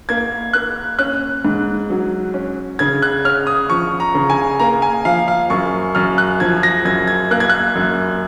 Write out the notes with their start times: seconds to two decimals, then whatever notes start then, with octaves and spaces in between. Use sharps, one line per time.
0.09 A#3 G#6
0.53 A#3 F#6
0.99 C#4 F#6
1.45 G#2
1.90 F#3
2.34 C#4
2.79 C#3 G#6
3.02 F#6
3.25 C#4 F6
3.47 D#6
3.70 F3 C#6
4.00 A#5
4.15 C#3
4.30 G#5
4.60 A#3 A#5
4.82 G#5
5.05 F3 F5
5.28 F5
5.50 F#2 C#6
5.95 F#2 F6
6.18 F#6
6.40 F3 G#6
6.63 A#6
6.85 F#2 G#6
7.07 G#6
7.31 A#3 F#6
7.40 G#6
7.50 F#6
7.76 F#2